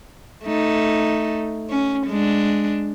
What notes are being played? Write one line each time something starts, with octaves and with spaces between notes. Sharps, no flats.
A3 D#4
C#4
G#3 D4